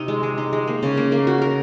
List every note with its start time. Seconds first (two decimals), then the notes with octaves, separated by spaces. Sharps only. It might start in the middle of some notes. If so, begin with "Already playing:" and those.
Already playing: C3 C4 D#4
0.08 G#3
0.23 G#3
0.38 D#4
0.53 G#3
0.67 A#3
0.83 C#3
0.97 A#3
1.12 A#3
1.27 F#4
1.42 A#4